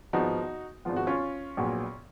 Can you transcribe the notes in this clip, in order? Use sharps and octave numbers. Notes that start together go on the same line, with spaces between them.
G#1 G#2 F3 B3 D#4 F#4
G#1 G#2 F3 B3 F4
F#4
C#4 F4
A#1 A#2 F#3 B3